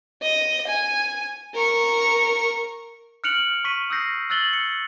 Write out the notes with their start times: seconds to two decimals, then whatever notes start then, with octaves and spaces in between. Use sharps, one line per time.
0.22 D#5
0.67 G#5
1.54 A#4 C#6
3.24 F6 F#6 C#7 D7 F7 F#7
3.64 C#6 B6 D#7
3.90 D#6 E6 F#6 G6 A#6 C7
4.30 E6 F#6 A6 F#7 G7
4.53 C#7